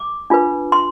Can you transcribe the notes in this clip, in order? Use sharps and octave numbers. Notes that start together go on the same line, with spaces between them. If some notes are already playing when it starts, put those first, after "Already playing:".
Already playing: D6
D4 F4 B4
C6